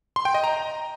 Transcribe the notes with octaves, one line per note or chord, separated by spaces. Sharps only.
C6
G5
D#5
A#5